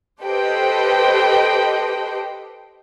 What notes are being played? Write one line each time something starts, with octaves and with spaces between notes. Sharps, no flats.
G4 A4 B4 C5 D#5 G5